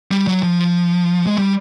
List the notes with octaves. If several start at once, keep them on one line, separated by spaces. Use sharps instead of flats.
G3
F#3
F3
G#3
G3